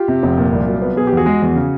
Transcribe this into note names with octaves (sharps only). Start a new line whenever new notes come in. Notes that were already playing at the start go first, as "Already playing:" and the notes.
Already playing: F4 G4
C3
F1
A#2
C2
F#3
B3
B2 G#4
G4
E2 F#4 G#4
G#3
E2
C#3